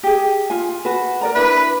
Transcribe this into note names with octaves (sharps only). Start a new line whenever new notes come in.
G4 G#4
F4 G#5
F#4 B4
A#4 D5 A#5
D4 E4 B4 E5